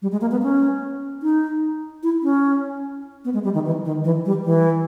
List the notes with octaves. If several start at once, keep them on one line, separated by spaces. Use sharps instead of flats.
G3
G#3
A#3
B3
C#4
D#4
E4
C#4
B3
G#3
G3
D#3
E3
D#3
E3
G3
E3